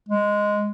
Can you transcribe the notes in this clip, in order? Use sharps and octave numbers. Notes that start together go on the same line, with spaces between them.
G#3